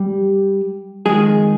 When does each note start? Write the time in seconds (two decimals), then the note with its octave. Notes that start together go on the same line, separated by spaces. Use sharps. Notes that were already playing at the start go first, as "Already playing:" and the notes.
Already playing: G3 G4
1.06 F2 D#3 G#3 G#4